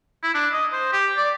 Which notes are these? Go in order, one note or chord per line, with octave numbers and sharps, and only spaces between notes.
E4
D4
D#5
C5
G4
D5